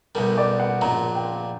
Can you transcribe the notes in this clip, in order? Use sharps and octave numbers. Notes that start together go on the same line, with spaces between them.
B1 B2 G3 A#4
D5
F#5
A#1 A#2 F#3 A#5
G5